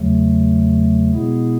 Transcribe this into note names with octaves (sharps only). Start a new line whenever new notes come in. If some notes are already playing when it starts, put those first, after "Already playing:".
Already playing: E2 C#3 F#3 A3
B2 G#3 B3 E4 G#4